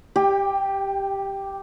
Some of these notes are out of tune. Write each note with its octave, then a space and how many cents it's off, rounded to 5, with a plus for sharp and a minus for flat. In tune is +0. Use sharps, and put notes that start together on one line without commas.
G4 +0 G5 +30